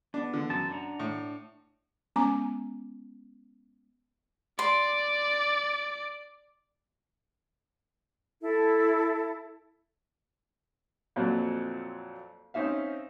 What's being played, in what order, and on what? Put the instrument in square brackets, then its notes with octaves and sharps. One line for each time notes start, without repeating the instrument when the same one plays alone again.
[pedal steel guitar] B3 [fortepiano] D4
[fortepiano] D3
[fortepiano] F#2 [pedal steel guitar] A5
[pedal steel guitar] D4 F#5 A#5
[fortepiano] A2
[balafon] G#3 B3 C#4 G#5 A#5 D6
[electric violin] D5 [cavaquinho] C6
[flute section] E4 A4
[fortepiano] F2 A#2 F#3 C4
C4 C#4 D#4 E5 F5